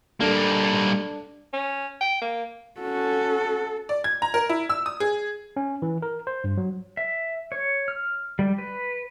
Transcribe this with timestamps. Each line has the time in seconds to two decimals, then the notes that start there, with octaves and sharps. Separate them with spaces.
0.20 G3 A#3 D4 A4
1.53 C#4
2.01 G5
2.22 A#3
2.80 C#4 F#4 A4
3.89 D5
4.04 G#6
4.22 A#5
4.34 A#4
4.49 E4
4.70 E6
4.86 D#6
5.00 G#4
5.56 C#4
5.82 E3
6.02 A#4
6.27 C5
6.44 G2
6.57 F#3
6.97 E5
7.52 C#5
7.88 F6
8.39 G3
8.58 B4